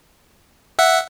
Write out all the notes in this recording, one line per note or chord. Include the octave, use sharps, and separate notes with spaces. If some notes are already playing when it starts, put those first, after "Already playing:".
E5 F#5